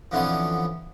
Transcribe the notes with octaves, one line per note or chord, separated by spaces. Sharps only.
F2 D3 E3 B3 C#4 C6